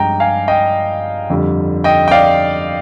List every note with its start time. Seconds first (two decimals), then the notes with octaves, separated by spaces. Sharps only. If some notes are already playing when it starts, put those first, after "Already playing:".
Already playing: G2 F3 G#3 D#5 G5 A#5
0.20 F5 G#5
0.48 D#5 G5
1.30 F2 D3 G3
1.84 D#5 G5
2.08 G5
2.11 D5 F5